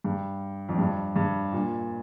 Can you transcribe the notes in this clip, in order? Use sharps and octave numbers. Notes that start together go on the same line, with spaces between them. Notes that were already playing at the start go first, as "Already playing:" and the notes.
G2
F2
G2
G2
A#2